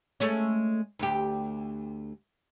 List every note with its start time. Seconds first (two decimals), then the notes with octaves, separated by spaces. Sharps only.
0.20 G#3 A3 C#4
0.99 D2 G4